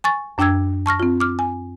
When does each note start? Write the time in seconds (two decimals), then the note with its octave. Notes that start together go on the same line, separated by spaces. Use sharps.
0.04 G#5 C#6 A6
0.38 F#2 D4 G5 D6 E6 G#6
0.86 A5 C#6 F6 A#6
1.00 C4 F4
1.20 D6 F6
1.39 G#5